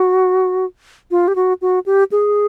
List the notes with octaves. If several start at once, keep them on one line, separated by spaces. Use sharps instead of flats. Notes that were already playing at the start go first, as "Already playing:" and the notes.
Already playing: F#4
F4
G4
F#4
F#4
G4
G#4